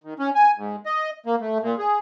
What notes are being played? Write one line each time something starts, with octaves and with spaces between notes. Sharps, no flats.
D#3
C#4
G#5
G#2
D#5
A#3
A3
A#2
G#4